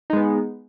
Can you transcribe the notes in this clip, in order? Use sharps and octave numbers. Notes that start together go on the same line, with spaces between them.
G#3 B3 D#4